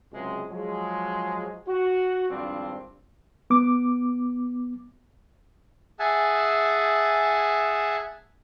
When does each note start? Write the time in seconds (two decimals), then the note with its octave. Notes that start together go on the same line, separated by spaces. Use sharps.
0.12 C#2 C3 F#3 G#3
0.49 F3 F#3 G#3
1.67 F#4
2.30 G#1 G2 F3 C4 D4
3.50 B3 D6
5.99 G#4 E5 F#5 G#5 A5